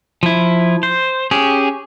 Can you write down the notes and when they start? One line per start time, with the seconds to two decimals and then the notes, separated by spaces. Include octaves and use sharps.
0.23 F3 E4
0.83 C5
1.31 C#4 G4 G#4